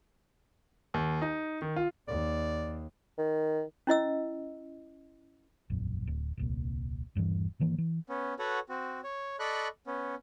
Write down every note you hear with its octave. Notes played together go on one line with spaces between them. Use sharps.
D#2
D#4
D#3
F4
D#2 D5
D#3
C#4 E4 D#5 E6
E1 A#1 F#2
D1
D#1 C2 A#2
D#1 G2 A#2 E3
G#2 D#3 E3 A#3
E3
B3 C#4
F#4 A4 B4 C#5 F#5
C4 F#4
C#5
A4 D5 D#5 B5 C#6 F#6
B3 C#4